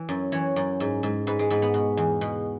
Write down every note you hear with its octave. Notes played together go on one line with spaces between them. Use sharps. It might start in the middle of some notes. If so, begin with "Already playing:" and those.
Already playing: E3
F#2
E3 C#5
F#2
G#2
G#2
G#2 B4
G#3
G#2 B3
B3
B2
E2
B2